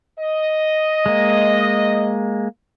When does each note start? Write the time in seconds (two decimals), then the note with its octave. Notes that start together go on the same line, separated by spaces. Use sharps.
0.20 D#5
1.06 G#3 A#3